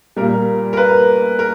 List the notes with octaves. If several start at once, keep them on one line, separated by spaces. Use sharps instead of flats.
A#2 G3 A#4
A#4
B4
A#4